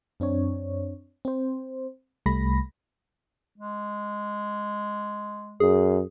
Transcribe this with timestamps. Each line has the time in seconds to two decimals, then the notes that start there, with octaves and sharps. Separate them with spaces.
0.20 F#2 C4 D4 C#5
1.25 C4 C5
2.26 C2 G3 A3 B5 A#6
3.58 G#3
5.60 F#2 G#4